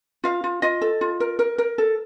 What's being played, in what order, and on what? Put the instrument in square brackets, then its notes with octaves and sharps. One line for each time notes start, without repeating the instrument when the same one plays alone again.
[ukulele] F4 F5
F4
F4 D#5
A4
F4
A#4
A#4
A#4
A4